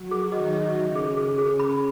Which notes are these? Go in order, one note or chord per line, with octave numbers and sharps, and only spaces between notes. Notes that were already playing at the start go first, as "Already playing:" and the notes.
Already playing: F#3 F#4
G#4
D#3 D#4 D#5
D#5
C#3 C#4 E5
G#4
C#3 C#4 G#4
G#4
C#3 C#4 B5